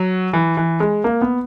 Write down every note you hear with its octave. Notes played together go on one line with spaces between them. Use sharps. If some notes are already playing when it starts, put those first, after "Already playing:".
Already playing: F#3
E3
E3
G#3
A#3
B3